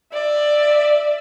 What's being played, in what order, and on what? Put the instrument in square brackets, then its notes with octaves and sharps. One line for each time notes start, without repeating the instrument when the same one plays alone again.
[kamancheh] D5 E5